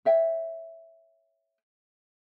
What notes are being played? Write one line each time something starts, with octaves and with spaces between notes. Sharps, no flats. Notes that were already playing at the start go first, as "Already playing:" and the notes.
C#5 E5 G5